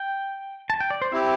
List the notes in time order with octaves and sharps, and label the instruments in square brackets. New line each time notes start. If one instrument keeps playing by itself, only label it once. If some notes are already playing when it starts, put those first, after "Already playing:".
Already playing: [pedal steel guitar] G5
A5
G5
D5
C5
[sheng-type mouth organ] C4 E4 G4 [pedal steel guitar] E5